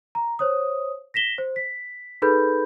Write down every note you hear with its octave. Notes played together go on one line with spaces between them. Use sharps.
A#5
C5 C#5 D#6
A#6 B6 E7 G7
C5
B6
D#4 G#4 A4 B4 B5 G6